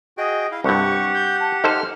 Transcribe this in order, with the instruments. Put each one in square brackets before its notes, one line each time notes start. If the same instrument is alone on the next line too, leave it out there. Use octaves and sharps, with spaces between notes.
[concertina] F#4 G#4 G5 [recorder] D#5
[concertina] E4 F5
[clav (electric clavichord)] C2 G2 [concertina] G4 F#5 [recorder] C#6
[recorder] G6
A5
[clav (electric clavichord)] D#4 A4 C5 [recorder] F6